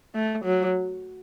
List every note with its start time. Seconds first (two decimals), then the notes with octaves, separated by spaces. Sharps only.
0.15 A3
0.45 F#3